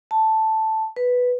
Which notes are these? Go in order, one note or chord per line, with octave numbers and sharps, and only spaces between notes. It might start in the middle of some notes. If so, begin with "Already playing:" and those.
A5
B4